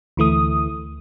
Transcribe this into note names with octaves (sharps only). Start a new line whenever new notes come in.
D2 E3 A3 D#6